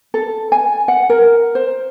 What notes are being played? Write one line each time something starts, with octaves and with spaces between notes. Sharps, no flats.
A4
G#5
F#5
A#4
C5